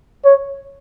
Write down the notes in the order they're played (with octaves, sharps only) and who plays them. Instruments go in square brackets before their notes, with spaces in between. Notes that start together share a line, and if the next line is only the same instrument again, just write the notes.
[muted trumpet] C#5